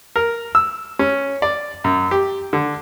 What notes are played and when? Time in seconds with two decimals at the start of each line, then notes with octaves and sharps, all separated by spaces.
0.16 A#4
0.55 E6
0.99 C#4
1.42 D5
1.84 F#2
2.11 G4
2.53 D3